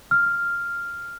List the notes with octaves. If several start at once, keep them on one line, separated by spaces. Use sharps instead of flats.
F6